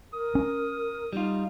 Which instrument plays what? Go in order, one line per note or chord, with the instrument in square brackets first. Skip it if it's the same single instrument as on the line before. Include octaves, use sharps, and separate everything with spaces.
[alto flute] A#4 [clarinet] D#6
[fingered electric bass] C#4
[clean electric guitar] G3 F4 [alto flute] D#4